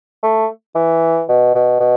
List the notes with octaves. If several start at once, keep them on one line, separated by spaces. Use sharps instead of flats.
A3
E3
B2
B2
B2